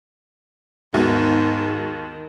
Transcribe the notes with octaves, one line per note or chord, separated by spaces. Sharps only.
D#2 G#2 D#3 B3 F#4